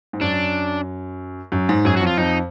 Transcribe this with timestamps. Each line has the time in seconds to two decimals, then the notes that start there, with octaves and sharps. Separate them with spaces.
0.13 G#2
0.21 F#2 D4
1.52 F#2
1.69 G#2
1.85 F#2 G#4
1.96 F2 F#4
2.07 F4
2.17 F2 D#4